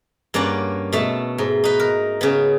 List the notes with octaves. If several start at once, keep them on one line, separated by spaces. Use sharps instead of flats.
G2 A#3 C#4 D5 F#5
B2 A3 A5
G#2
D#4 B4
A#4
C#3 B3